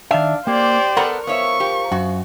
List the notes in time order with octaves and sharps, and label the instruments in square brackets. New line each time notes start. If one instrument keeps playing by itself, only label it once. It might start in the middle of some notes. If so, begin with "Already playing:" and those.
[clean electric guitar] D#3 E5 [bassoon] D4 [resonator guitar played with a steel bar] F5
[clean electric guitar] A#3 [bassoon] G4 [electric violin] C5 D5
[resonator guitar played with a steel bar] B3 A4 F#5 [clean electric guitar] A#4
[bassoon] F3 [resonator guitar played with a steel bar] B3 C#5 E5 [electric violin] C#6
[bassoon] F3 [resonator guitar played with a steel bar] G4
[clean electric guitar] F#2 [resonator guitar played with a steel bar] F#4